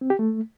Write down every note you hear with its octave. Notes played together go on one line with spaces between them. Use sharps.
C4
G4
A3